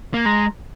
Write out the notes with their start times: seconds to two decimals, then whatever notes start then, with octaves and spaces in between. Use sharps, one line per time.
0.14 A#3
0.25 G#3 A#5